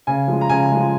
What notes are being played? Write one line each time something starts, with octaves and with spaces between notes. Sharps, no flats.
C#3 G#5
F3 G#3
A#5
C#3 G#5
F3 G#3